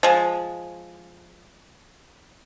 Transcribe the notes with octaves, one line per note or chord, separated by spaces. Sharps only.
F3 G#3